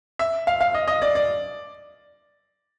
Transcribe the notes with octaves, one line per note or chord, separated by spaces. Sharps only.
E5
F5
F5
D#5
D#5
D5
D5